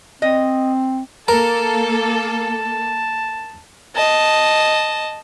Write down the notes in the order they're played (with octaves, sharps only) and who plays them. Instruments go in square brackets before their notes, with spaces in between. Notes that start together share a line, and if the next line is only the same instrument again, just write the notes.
[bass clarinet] C4 [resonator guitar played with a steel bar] D#5
[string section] A#3 A4 [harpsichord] A#4 [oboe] A5 [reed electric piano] A#5
[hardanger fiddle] D#5 A5